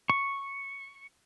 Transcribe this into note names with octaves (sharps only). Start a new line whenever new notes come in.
C#6